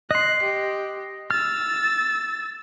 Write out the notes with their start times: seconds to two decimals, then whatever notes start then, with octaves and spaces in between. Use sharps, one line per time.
0.11 D#5 C6 F#6
0.43 G4
1.31 E6 F6 A6